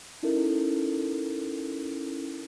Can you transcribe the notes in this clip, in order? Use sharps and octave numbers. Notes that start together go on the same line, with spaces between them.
C#4 D#4 E4 A4 A#4